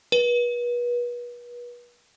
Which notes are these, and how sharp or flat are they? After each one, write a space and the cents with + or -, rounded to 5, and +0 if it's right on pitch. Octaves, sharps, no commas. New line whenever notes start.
B4 -35